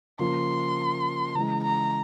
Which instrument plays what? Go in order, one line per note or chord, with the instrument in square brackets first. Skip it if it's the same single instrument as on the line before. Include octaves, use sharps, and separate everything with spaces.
[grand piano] C#3 F3 A#3 [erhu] C6
[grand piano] C#3 E3 G#3 [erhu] A#5
[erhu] A#5